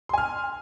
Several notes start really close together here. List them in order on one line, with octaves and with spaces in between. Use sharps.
C6 G#5 F6